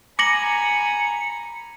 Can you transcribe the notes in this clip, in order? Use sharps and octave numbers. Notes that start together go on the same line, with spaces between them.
G#5 A#5 B5 D6 A#6 C#7 F#7